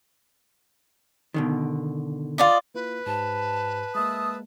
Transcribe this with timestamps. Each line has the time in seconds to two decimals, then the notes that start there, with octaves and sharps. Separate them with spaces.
1.34 B2 D3 D#3
2.38 F4 D5 D#5
2.75 A#3 E4 F4 B4
3.07 G#2 G4 C5 A5
3.95 G#3 A#3 E5 A5 D#6